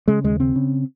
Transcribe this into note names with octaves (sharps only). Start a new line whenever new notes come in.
C#3 G#3
D#2 G#3
C#3 C4
C#3